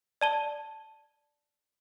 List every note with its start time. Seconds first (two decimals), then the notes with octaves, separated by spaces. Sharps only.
0.21 D5 A5 G7